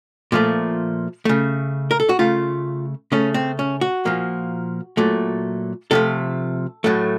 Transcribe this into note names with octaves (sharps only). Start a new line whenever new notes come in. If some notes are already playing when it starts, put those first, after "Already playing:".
A#2 F3 A3
C#3 A3
A#4
A4
F#4
C#3 A3 F4
C#3 A3 C#4
C4
C#4
F#4
A#2 F3 A#3
A#2 F#3 A3
C3 F3 A3 A4
A2 F#3 A3